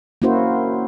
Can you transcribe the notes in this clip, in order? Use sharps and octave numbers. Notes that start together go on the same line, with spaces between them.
A#3 C#4 E4 F#4 C5